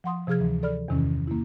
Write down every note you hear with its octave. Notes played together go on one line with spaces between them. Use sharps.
F3 F#5 C6 D#6
C3 F3 G#4 F6 G#6
D2 E3
A4 D5 B5 F6
E2 G2 C3 D#3 E3 C#4
A#3 E4